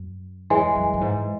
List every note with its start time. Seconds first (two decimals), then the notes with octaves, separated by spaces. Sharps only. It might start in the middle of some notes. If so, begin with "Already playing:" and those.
Already playing: F#2
0.50 E2 E3 G#3
0.75 F#2
0.94 F#2
1.01 G#2